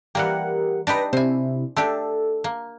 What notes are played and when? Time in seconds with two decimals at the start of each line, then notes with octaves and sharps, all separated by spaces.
0.15 E3 G3 A#3 G4 A#4 F#5
0.87 D4 D#4 G4 B4 A#6
1.13 C3 E4 C5 G#5
1.77 A3 D4 G4 A4
2.44 A#3